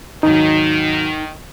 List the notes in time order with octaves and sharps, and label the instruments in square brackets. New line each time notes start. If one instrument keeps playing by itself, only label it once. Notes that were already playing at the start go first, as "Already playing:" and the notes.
[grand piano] D#2 G#2 F#3 [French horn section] D#3 [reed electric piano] D#4